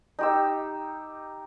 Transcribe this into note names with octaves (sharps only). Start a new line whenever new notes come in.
D#4 G4 E6